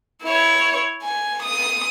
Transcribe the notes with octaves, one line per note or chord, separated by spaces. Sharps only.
E4 C#5
G#5
D#6